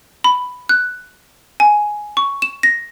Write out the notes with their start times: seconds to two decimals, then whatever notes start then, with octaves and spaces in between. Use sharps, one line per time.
0.24 B5
0.69 F#6
1.60 G#5
2.17 C#6
2.42 E7
2.63 A#6